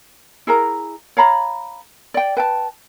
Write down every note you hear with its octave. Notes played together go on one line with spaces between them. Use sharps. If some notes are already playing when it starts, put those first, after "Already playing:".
E4 G#4 A#4 A#5
C#5 F5 A#5 B5
D5 G5
B4 G5 A5